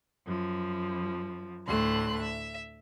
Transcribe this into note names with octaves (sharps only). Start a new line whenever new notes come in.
F#2 F3
D2 A2 A3 C6 F#6
E5